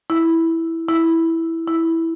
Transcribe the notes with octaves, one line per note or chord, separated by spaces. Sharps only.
E4
E4
E4